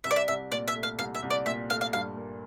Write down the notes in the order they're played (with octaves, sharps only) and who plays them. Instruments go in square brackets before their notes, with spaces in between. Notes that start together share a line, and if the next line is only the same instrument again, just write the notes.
[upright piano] C2 [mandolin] E5
[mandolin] D5
E5
[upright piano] C2 [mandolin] E5
[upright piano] A#2 [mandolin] D5
[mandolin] E5
[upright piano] A3
[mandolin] F5
[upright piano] C2 [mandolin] F5
[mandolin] E5
[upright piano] C2
[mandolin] D5
[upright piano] A#2 [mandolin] E5
[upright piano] A3 [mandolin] F5
[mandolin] F5
[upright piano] G2 [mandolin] F5
[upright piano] A#3